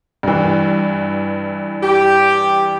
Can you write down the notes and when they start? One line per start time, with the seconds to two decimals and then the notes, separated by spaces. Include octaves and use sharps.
0.23 G2 E3
1.83 G4